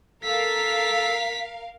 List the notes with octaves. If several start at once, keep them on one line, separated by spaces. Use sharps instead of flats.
A4 A#4 F5 B6